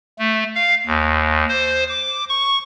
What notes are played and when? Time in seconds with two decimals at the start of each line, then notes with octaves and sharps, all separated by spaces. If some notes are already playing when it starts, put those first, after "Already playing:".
0.19 A3
0.55 F5
0.86 D#2
1.49 C5
1.89 D6
2.30 C#6